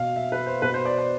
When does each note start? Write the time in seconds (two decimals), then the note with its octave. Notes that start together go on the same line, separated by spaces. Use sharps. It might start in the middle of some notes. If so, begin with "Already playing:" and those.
Already playing: B2 F5
0.16 E5
0.32 B4
0.46 C5
0.62 B2 B4
0.74 C5
0.85 D5
0.98 D5